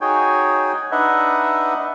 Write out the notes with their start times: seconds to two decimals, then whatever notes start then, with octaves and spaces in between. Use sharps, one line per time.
0.01 D#4 F#4 G#4 C#5 G5 G#5
0.92 D4 D#4 B4 D#5 E5 F#5